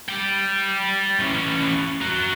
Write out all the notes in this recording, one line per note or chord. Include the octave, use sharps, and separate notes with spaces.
D5 G5
E3 C#4
F#4 A#4